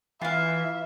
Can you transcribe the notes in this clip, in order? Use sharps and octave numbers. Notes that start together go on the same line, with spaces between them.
E3 F4 E5 F5